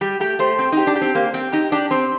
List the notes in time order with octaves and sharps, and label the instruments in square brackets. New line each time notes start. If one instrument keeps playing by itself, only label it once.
[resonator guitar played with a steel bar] G3 [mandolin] G4
[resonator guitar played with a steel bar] A3 [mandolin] G4
[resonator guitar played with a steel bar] A3 [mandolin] C5
[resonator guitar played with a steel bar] C4 [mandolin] G5
[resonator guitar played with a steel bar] D#4 [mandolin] G4
[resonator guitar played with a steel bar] D4
[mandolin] G4
[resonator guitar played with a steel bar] C4
[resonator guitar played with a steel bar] A#3 [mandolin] C5
[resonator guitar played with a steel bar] C4 [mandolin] G5
[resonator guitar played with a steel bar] D#4 [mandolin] G4
[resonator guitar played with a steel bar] D4 [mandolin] G4
[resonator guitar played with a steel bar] C4 [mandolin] C5